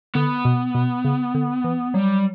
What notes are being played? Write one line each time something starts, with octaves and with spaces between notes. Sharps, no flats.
D3 B3
B2
B2
C#3
D3
E3
F#3 G3